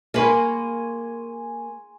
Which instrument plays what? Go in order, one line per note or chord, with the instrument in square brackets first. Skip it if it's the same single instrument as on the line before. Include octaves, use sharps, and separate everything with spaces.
[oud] A#3 B4 [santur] G#5 C6 C#6